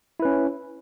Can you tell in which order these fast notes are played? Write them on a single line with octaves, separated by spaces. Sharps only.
E4 B4 C#4